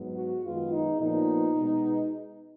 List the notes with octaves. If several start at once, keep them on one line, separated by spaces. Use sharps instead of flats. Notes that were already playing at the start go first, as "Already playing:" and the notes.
Already playing: G#2 F#3 B3
F#4
F#2 D#3 G#3 B3 F4
D#4
A#2 F3 B3 D#4
B2 G#3 B3